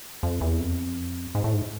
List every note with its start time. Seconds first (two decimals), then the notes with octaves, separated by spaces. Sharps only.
0.23 F2
0.41 E2
0.60 F2
1.35 G#2
1.44 A2
1.53 G#2